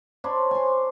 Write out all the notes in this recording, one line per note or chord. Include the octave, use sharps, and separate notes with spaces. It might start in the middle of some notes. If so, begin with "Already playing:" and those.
D4 C5 C#5 B5
C5 G#5